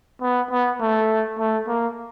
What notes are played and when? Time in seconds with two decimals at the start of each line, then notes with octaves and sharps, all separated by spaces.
0.22 B3
0.51 B3
0.80 A3
1.39 A3
1.68 A#3